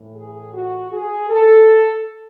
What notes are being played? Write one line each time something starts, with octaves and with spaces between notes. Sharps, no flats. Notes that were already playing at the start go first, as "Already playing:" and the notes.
Already playing: A2 E3
G#4
F#4
G#4
A4